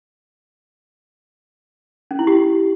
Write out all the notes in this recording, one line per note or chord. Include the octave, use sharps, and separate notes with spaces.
C#4
E4
G4